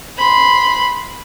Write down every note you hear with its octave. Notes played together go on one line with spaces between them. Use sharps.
B5 C6